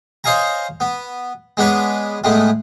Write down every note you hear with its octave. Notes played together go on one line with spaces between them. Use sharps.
C5 C#5 D#5 F5 G#5 A#5
B3
G#3 B3 D4 B4 C#5
A2 G#3 A3 B3